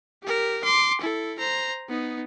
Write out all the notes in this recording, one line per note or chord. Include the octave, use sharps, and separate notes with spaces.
G4 A#4
C6 D6
E4 A4
C5 A#5
B3 D#4